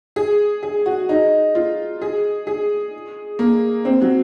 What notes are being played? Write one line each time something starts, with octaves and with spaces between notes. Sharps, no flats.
G#4
G#4
F#4
D#4
F4
G#4
G#4
A#3
C4
F#3